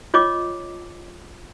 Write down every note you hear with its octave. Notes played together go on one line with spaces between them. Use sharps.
F4 C#5 D#5 D6